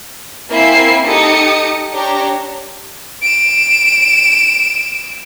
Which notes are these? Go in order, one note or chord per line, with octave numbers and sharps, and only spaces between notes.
A#3 C4 E4 E5 G#5 C7
D#4 G4 A4 D#6 C#7
D4 G4 C#5 A#5
D7 E7